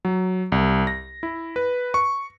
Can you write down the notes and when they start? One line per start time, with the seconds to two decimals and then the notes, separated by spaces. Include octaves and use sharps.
0.05 F#3
0.52 C2
0.87 A#6
1.23 E4
1.56 B4
1.94 C#6